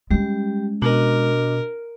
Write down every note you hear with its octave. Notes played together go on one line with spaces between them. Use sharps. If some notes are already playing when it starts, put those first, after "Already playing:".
G3 G#3 C#4 G4
B2 D4 F#4 A#4 D#5